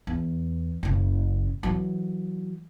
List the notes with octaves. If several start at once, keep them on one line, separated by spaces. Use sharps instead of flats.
E2
F#1 C#3
E3 F#3